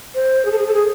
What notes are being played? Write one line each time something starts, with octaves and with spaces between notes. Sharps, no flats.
C5
G#4
A4
G#4
A4
G#4